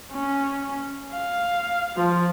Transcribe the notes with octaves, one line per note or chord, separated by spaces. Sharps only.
C#4
F5
F3